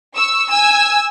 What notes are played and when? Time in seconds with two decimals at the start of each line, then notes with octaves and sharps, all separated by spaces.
0.16 C#6 E6
0.48 G#5 E6